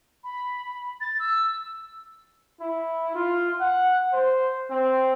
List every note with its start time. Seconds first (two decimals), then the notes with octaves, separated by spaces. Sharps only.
0.24 B5
1.01 A6
1.20 E6
2.60 E4
3.15 F4
3.60 F#5
4.13 C5
4.71 C4